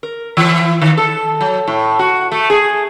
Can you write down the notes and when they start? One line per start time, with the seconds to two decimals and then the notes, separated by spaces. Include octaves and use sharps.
0.03 A#4
0.37 E3
0.82 D#3
0.97 A4
1.41 F#3
1.68 A2
1.99 F#4
2.32 A3
2.50 G#4